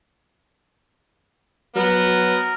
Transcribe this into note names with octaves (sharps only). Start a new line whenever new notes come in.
F#3 B3 A#4